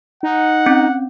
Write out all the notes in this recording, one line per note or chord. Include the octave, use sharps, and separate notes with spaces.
D#4 F#5
C4 C#4